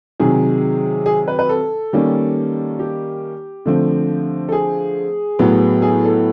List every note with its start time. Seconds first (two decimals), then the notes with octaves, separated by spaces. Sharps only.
0.20 C3 D#3 F#3 G#4
1.06 G#4
1.28 B4
1.39 B4
1.49 A4
1.93 D#3 G3 A#3 C#4
2.79 G4
3.66 D3 F3 A3 C4
4.49 A4
4.52 G#4
5.39 A2 F#3 B3
5.82 G#4
6.05 A4